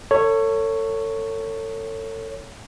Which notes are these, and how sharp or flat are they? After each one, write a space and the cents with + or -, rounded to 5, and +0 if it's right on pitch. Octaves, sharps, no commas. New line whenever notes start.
A4 +35 C#5 +0